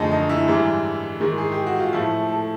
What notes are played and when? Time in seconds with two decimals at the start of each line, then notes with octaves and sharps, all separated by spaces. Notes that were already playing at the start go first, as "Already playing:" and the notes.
Already playing: F#2 D3 F3 A3 D#4 G#4
0.12 D#4
0.29 E4
0.48 G#2 E3 G3
1.20 G#2 D#3 G#3
1.38 G#4
1.52 G4
1.66 F#4
1.80 F4
1.93 A2 F3 A3 E4
2.29 A4